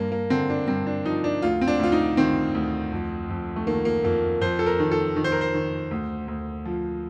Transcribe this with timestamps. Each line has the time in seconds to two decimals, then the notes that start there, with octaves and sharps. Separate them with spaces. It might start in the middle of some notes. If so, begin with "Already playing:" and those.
Already playing: G2 A#3
0.12 A#3
0.30 D3 C4
0.50 D4
0.68 G2 C4
0.87 D4
1.05 F3 D#4
1.24 D4
1.42 D2 F4
1.61 C4
1.68 D4
1.79 D2 F4
1.92 D#4
2.17 D#3 C4
2.55 D2
2.92 F2
3.29 F2
3.56 A3
3.67 D#3 A#3
3.85 A#3
4.04 F2 A#3
4.41 F2 C5
4.59 A4
4.66 A#4
4.79 D#3
4.92 A4
5.16 D#3
5.24 C5
5.32 A#4
5.41 C5
5.54 D#3
5.91 D2
6.28 D2
6.65 F3